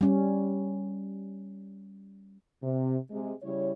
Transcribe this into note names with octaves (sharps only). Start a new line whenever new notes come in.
G3 C#4
C3
C3 G#3
C#3 G3 E4 C#5